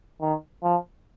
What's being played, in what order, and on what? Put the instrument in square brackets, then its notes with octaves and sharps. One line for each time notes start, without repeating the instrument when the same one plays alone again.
[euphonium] D#3
F3